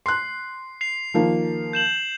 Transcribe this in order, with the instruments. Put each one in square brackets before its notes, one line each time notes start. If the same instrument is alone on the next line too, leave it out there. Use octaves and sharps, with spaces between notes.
[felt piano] C6 F#6 [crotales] C7
[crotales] C7 F7
[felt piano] D#3 F3 A#3
[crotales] G6 E7 F#7